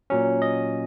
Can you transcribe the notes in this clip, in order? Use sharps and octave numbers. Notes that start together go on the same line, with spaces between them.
A#2 F#3 C#4
D#5